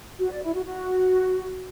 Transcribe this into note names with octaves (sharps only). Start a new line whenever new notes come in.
F#4
D5
E4
F#4
F#4